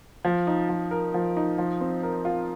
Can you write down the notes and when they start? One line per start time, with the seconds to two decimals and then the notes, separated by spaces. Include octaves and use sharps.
0.25 F3
0.47 D#4
0.69 F3
0.91 A#4
1.14 F3
1.37 D#4
1.58 F3
1.81 C4
2.03 A#4
2.25 F4